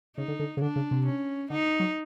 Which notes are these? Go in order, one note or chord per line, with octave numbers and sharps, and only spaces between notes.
C#3 D#4
D3
D3
C#3
D3 D4
C#3
C3
C#4
D3 D#4
F#3